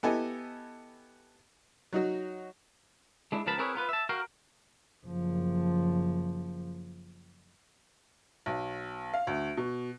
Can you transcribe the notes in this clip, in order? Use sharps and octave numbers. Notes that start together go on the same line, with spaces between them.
B3 E4 G4 A4 D#5 G#5
F#3 D#4 F#4
G#3 D4 E4
C#2 F3 B3 A#4 A5 B5
C4 E4 G#4 A#4 B4 C#5
B3 F4 B4
E5 A5
F#4 A#4 F5 G5
F#1 F3
B1
F5
D2
B2